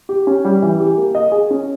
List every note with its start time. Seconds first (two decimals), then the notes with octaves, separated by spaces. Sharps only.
0.09 G4
0.27 C#4
0.45 G3
0.62 E3
0.80 G4
0.97 A#3
1.15 D#5
1.32 G#4
1.51 C#4